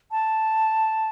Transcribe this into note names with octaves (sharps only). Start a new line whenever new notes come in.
A5